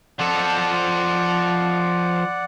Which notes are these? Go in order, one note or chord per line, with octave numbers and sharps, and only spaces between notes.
F3 A4 D5 F#5